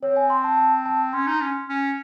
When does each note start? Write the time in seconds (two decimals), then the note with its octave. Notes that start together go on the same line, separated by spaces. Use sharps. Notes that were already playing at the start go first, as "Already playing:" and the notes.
0.03 C4 C#5
0.16 G#5
0.30 C6
0.44 A5
0.57 A5
0.86 A5
1.13 C#4 C6
1.27 D#4
1.41 C#4
1.69 C#4